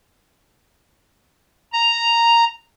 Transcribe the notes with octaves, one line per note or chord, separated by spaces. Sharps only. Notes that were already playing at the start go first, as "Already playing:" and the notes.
A#5